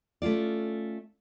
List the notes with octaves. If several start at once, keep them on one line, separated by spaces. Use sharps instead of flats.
A3 C#4 F4 D5